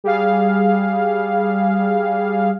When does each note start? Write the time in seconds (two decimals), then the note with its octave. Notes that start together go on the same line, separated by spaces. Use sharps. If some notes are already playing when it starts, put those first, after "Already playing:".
0.04 G3 G#4 F5